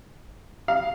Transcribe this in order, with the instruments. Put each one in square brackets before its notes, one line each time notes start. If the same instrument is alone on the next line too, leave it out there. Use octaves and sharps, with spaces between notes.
[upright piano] F5